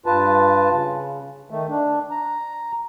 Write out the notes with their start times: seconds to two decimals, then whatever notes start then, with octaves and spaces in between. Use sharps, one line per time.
0.06 G2 F4 B4 A5
0.71 C#3
1.50 D#3 A3
1.69 D4
2.10 A#5